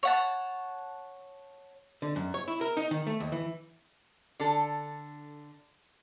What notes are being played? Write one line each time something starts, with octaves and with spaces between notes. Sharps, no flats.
C#5 F#5 A5
D3
F#2
C#5
E4
A#4
D#4
D#3
A3
D#2
E3
D3 A4